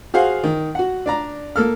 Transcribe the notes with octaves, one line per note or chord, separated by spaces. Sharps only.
F#4 G#4 C5 F5 F#5
D#3
F#4 F#5
D4 D5 A#5
A#3 A4 F6